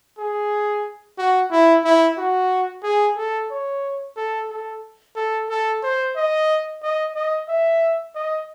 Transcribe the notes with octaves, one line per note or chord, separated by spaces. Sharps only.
G#4
F#4
E4
E4
F#4
G#4
A4
C#5
A4
A4
A4
A4
C5
D#5
D#5
D#5
E5
D#5